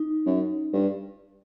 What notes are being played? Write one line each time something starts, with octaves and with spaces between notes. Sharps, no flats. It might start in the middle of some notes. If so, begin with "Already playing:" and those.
Already playing: D#4
F#2
G2